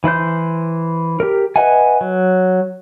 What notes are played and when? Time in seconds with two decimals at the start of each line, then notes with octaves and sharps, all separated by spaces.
0.04 E3 E4 C5 G6
1.20 G4 A#4
1.56 B4 D#5 E5 F#5 G#5
2.01 F#3